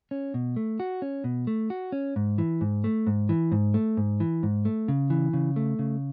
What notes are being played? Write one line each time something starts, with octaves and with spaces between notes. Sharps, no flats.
C#4
B2
A3
F#4
C#4
B2
A3
F#4
C#4
G#2
E3
G#2
A3
G#2
E3
G#2
A3
G#2
E3
G#2
A3
C#3
E3
C#3
A3
C#3